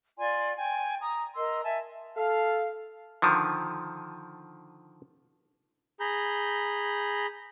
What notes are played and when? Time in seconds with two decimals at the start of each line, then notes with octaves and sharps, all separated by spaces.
0.19 F4 D5 G#5 C6
0.57 G5 G#5
1.02 A#5 D#6
1.36 A#4 D#5 C6 E6
1.64 E5 G#5 A5
2.17 A4 F5
3.22 D3 D#3 F3
6.00 G#4 A#5 B5 G6